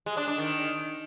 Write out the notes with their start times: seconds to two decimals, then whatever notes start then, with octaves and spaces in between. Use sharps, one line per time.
0.06 G#3
0.17 D4
0.28 D4
0.38 D#3